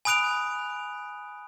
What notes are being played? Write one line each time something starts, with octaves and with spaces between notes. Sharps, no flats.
G#5 B5 D#6 F#6 D7 F7